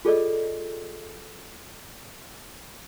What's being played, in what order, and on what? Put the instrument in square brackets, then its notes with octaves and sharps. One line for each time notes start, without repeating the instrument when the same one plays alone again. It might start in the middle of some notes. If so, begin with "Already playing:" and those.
[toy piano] F4 G#4 A4 D5 D#5